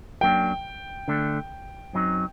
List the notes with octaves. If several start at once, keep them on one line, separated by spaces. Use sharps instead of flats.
F#2 F#3 A#3 D4 G5
D3 A3 D4
F#2 F#3 C4 D#4